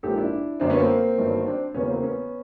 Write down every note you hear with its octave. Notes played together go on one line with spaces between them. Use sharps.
A#1 G#2 F3 A#3 G4 A4
D4 E4
F#2 D3 F#3 A#3 C4 D4
B3 C#4
A#3 C4
G1 G2 D#3 F#3
C4 D4
E2 C#3 F#3 A#3 B3 C#4
A#3 C4
B3 C#4